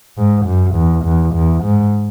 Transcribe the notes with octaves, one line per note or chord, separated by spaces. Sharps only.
G#2
F#2
E2
E2
E2
G#2